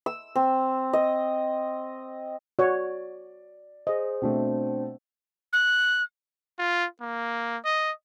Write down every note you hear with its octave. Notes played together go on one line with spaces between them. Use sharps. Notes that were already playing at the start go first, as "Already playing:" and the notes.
E6
C4
D#5
F#4 C#5 D5
G#4 C5 D#5
B2 A3 C4 D4 C5
F#6
F4
A#3
D#5